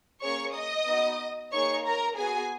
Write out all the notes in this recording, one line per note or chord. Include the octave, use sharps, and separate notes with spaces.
A#3 C#4 G#4 C#5 C#6
D#5 D#6
B3 D#4 F#4
A#3 D#4 G#4 C#5 C#6
A#4 A#5
B3 F#4 G#4 G#5